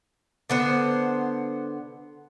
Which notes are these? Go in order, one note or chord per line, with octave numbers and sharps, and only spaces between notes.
D3 B3 C5